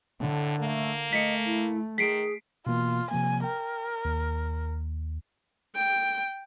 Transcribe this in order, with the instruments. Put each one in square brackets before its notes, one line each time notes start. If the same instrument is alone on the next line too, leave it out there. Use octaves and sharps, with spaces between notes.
[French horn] A2 [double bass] D3
[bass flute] A3 [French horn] A#3
[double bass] A3 [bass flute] D#5 [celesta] B6 C#7
[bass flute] E4
[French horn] D#3 [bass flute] G#4 [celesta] B6 C7 D7
[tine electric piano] B2 E3 A#3 [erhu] F4
[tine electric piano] C3 F3 A#3 [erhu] G#5
[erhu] A#4 [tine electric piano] G5
[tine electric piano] D#2
[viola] G5